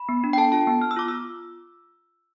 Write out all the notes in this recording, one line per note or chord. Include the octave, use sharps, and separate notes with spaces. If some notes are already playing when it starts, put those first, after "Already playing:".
Already playing: B5
B3
D4
G5
A4 A5
F4 A5
B3
B3 F6
E6
F4 D6
F4 E6